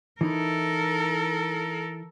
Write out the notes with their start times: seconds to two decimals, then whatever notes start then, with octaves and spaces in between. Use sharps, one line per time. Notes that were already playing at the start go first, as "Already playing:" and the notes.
0.21 E3 D#4 E4 A4 A#4